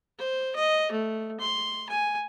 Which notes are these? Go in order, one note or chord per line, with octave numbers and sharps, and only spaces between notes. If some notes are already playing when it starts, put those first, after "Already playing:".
C5
D#5
A3
C6
G#5